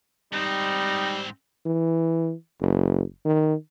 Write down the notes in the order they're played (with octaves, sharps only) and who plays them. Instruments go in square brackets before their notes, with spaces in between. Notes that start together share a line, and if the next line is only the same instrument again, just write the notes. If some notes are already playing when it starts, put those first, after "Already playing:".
[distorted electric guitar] G#2 C4 [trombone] G3 [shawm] D#4
[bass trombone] E3
F#1
D#3